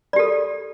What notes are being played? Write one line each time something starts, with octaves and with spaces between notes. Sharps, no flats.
G4 A4 D5